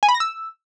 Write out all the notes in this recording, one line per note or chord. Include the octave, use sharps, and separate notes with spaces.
G#5
B5
A#6
E6